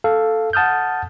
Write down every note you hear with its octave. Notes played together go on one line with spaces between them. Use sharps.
A4 F5
F#5 A5 D#6 F6 G6